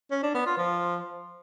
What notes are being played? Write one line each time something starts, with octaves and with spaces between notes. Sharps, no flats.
C#4
D4
B3
F4
F3